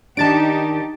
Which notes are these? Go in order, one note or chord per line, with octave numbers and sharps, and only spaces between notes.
D#3 D4 D#4 G4 A5 A6 D7